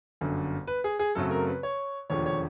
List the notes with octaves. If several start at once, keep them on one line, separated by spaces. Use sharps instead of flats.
G1 F#2 D3
B4
G#4
G#4
F#2 C#3 F#3 A3 C4 A4
A#4
B4
C#5
E1 D#2 D3 F3 C#5
C#5